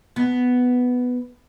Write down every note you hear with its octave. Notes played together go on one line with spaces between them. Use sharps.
B3